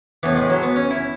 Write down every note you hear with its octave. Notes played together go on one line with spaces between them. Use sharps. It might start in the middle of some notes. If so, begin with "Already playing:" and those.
A2 E3 B3
G#3
F#3
B3
C#4
E4